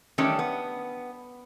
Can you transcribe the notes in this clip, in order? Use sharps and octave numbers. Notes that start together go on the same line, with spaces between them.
D#3 E3 G3 A3 C#4 D4
B3